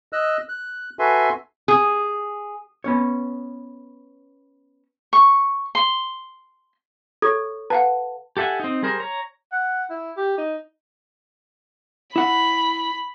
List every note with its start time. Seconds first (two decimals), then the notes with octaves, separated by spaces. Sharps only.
0.13 D#5 E6 F#6
0.49 F#6
0.99 F#4 A4 B4 E5 G#5 C6
1.68 G#4
2.84 B3 C#4 C#5
5.13 C#6
5.75 C6
7.22 A4 C#5 C#6 G#6
7.70 B4 F5 F#5 A5
8.37 G4 A4 E5 F#5 G#5
8.60 C4 D#4
8.82 G3 G#4 A#4 C5
9.00 C#5 A#5
9.52 F#5
9.90 E4
10.17 G4
10.38 D#4
12.16 E4 F#5 B5